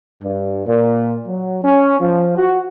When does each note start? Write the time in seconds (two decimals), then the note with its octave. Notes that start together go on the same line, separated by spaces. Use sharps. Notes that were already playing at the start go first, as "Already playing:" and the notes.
0.22 G2
0.66 A#2
1.26 F#3
1.63 C#4
2.00 F3
2.37 F#4